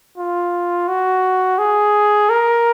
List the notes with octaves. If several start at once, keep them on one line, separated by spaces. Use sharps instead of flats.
F4
F#4
G#4
A#4